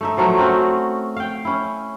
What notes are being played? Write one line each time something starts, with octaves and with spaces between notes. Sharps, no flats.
A3 D#4 E5
F3 F#3 A3 A#4
C4 C#4 F#4
F5 G5
C#4 E4